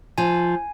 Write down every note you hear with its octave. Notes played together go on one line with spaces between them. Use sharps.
F3 G#5